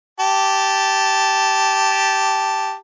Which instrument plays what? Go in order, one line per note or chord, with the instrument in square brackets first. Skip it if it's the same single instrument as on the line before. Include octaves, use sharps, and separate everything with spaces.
[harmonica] G4 A5